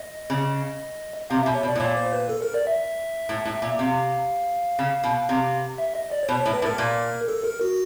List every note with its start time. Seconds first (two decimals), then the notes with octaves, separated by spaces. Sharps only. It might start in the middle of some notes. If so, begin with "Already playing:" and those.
Already playing: D#5
0.30 C#3
1.30 C3 F5
1.42 B2 E5
1.54 C#5
1.63 B2
1.68 D5
1.75 A2
1.80 A#2 C#5
1.97 C5
2.13 B4
2.29 A4
2.42 A#4
2.54 D5
2.67 E5
3.29 A2
3.45 A2
3.62 A#2
3.79 C3 F5
4.79 C#3
5.04 B2
5.29 C3
5.78 E5
5.95 D#5
6.11 D5
6.23 C#5
6.29 B2 C5
6.41 A2 C#5
6.53 B4
6.62 A2
6.65 A#4
6.78 A#2
7.28 A4
7.44 A#4
7.61 F#4